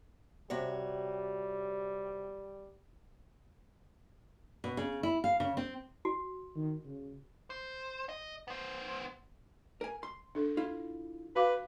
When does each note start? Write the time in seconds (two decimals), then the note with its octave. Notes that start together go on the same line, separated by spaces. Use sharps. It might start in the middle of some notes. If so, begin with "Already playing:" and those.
0.50 C3 G3 F#4 C#5
4.64 B2
4.77 C#3
5.03 E4
5.24 F5
5.40 C#3
5.57 C4
6.05 F#4
6.56 D#3
6.86 C#3
7.50 C5
8.09 D#5
8.48 B3 C5
9.81 A#4 G#5
10.03 C6
10.35 D4 A4
10.57 E4 F4
11.36 F#4 B4 F5 D6